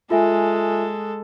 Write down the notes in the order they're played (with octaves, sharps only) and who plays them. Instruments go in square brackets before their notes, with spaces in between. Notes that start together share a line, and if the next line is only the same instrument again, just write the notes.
[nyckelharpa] G#3 A4 [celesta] F4 E5 G#5